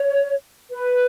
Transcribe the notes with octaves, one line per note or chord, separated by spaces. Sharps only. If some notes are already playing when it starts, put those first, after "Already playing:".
Already playing: C#5
B4